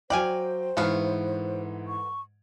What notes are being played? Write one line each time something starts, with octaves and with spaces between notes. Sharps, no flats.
F#3 C5 D5 F5 G5 G#5
G#2 E3 A3 B3 F5
C#6